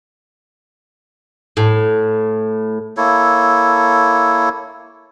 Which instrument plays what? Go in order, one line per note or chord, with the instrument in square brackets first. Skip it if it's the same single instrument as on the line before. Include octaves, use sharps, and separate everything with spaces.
[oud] A2
[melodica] A#3 E4 A4 C#5